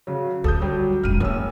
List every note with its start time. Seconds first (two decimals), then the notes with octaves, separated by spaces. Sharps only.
0.07 C#3 F#3
0.44 D2 A4 D#6 G6
0.62 F#3 G3
1.03 F1 G#2 F6 D#7
1.20 F#1 C#4 E4 E6